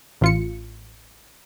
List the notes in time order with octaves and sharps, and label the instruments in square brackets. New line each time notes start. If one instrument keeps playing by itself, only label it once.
[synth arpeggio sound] A1 F4 C#7